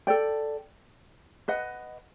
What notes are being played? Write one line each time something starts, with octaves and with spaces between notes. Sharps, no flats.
A4 D5 G5
B4 D#5 F#5